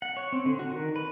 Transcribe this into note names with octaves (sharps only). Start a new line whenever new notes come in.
F#5
C#5
C4
D3
F#4
D#3
B4